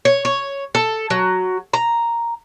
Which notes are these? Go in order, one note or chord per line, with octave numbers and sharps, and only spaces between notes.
C#5
C#5
A4
F#3
A#5